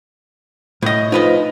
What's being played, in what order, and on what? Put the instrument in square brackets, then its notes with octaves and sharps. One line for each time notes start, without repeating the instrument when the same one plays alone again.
[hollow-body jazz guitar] A2 D#5 [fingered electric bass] A3
[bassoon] F3 [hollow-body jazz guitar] D#4 B4 D#5